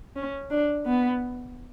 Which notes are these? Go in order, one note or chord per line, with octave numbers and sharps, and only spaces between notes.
C#4
D4
B3